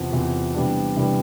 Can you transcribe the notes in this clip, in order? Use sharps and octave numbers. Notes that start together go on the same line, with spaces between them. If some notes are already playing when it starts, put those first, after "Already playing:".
Already playing: E2 C3 F3
E2 C3 F3
C3 E3 G3 B3 D4
C3 E3 G3 B3 D4